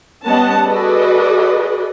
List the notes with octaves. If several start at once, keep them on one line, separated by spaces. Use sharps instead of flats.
G3 B3 C#4 D#5 F#5 A5
F#4 G#4 A4 B4 D5 D#5